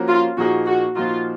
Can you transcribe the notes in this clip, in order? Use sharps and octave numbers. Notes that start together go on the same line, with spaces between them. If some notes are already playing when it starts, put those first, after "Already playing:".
Already playing: F3 A#3 C#4 F#4 A#4
F4
A#2 F3 A#3 D#4 F#4 G#4
F#4
A#2 F3 A#3 D#4 F4 F#4